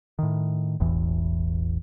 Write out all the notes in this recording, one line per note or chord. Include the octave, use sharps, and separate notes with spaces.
A2 D#3
E1 A1 E2 E3